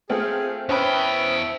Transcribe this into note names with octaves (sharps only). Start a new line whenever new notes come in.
A3 C4 F4 G#4
E2 C#4 B4 C5 E5 G5 A5 D#6